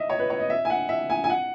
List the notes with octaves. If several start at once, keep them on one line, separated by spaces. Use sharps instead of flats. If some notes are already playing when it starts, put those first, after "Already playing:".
Already playing: D#5 E5
C#5
B4
C#5
D#5
E5
G#5
F#5
E5
G#5
G#5
F#5